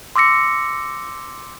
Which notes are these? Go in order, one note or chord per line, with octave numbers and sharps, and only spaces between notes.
C6 D6 E6 A#6 C#7